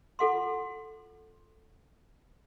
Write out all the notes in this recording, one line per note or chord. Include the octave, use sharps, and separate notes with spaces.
F4 A4 F#5 C6